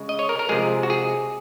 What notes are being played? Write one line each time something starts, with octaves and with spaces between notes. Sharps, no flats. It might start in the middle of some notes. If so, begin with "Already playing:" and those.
Already playing: C#3 G#3
D#5
C#5
A#4
A#4
C3 F3 G#3 G#4
F#4
G#4